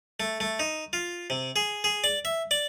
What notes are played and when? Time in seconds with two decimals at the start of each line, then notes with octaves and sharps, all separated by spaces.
0.20 A3
0.40 A3
0.59 D#4
0.93 F4
1.30 C3
1.56 G#4
1.84 G#4
2.04 D5
2.25 E5
2.51 D5